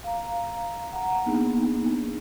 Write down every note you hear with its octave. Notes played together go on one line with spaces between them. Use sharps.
F5 A#5
F#5 A#5
A#3 B3 D4 D#4 G#4